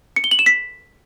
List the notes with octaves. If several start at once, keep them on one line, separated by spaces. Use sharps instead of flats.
C#7
G7
F#7
E7
B6